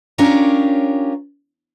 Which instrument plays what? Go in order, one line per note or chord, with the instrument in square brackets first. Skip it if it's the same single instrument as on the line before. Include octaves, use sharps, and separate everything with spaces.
[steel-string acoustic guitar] C#4 D4 F4 G4 A#4 C#5